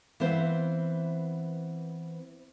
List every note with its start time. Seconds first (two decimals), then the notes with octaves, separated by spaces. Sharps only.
0.20 E3 B3 C4 C5 F5